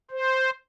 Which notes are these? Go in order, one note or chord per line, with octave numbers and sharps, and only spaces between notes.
C5